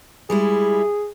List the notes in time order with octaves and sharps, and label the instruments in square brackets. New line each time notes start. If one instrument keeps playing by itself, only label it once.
[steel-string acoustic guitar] G3 G#3 E4 [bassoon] G#4